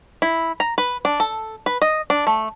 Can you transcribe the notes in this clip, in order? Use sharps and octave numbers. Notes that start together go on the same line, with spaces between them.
E4
A#5
B4
D4
A4
B4
D#5
D4
A3